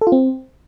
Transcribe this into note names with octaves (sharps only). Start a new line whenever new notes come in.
A4
F4
C4